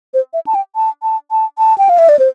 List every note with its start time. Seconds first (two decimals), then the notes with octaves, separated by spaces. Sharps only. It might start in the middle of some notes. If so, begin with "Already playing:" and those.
0.14 C5
0.33 E5
0.47 A5
0.55 G5
0.76 A5
1.03 A5
1.31 A5
1.58 A5
1.78 G5
1.89 F5
1.98 E5
2.09 D5
2.19 C5